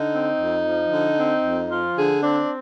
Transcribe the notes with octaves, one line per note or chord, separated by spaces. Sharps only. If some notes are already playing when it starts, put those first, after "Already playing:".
Already playing: D3 D#4
C4
F2
F3
D3
C4
F2
F3 F4
D3 G#4
C4 D4